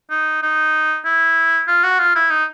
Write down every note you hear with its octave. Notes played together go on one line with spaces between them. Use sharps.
D#4
D#4
E4
F4
F#4
F4
E4
D#4